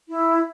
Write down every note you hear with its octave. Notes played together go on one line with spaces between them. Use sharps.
E4